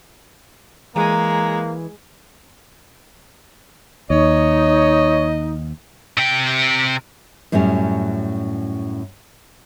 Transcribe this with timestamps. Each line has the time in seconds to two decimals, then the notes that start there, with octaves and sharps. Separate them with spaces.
0.96 E3 G#3 A#3 A#5
4.10 D#2 D#4 C#5 D#5
6.18 C3 G5
7.52 F#2 A2 F#3 G3 C#4